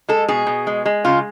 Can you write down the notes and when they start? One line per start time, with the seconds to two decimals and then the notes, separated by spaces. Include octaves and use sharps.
0.09 G#3 A4
0.28 B2 G#4
0.47 B2
0.67 G#3
0.86 G#3
1.05 C#3 F4